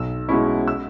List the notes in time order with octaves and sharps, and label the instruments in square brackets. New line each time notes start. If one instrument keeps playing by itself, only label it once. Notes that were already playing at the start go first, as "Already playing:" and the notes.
Already playing: [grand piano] B1 E6
B2 G#3 C#4 E4 C#6
E6